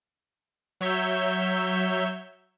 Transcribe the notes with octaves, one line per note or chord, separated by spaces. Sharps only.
F#3 C#5 E5 E6 G6